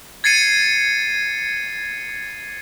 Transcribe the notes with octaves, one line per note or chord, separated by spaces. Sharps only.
G#6 A6 C7 C#7 D#7